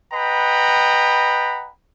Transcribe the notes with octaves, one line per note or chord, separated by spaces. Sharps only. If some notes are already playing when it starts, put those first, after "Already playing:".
B4 D#5 F#5 G5 A#5 B5